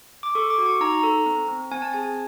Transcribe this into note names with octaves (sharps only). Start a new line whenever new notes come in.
D6
A4 C#6
D6
F#4
C#6
D#4 A#5
A4
C4
C4
C4 G#5
A5
G#4 G#5